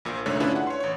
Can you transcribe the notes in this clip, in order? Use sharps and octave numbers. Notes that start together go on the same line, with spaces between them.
A#1 A#2
C2 G#2 D3 A3 C#5
C#4 D4 E4 F4 G#4 B4
F#5
C#5 C6
A1 C#5